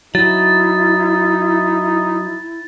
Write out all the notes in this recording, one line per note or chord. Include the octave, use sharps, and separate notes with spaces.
F#3 D#4 E4 A6